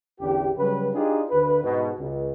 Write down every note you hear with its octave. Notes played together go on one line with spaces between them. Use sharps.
A1 E2 D3 G4
C#3 F#3 G3 B4
D4 D#4 F4 G4 G#4
D2 B4
G#2 B2
C#2